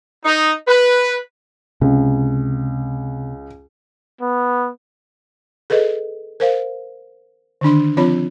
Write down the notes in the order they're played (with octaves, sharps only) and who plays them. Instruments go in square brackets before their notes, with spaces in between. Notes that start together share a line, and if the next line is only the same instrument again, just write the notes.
[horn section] D#4
B4
[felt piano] C#2 [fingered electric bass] C3
[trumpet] B3
[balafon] G#4 A4 B4 D#5
A#4 C5 F5
D3 D#3 D4 C6
F3 C4 F4 C#5 B5